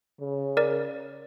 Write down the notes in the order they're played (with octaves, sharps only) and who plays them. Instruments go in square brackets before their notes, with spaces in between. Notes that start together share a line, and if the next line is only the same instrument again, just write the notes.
[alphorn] C#3
[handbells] A#4 D5